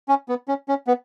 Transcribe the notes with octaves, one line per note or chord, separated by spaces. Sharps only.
C#4
B3
C#4
C#4
B3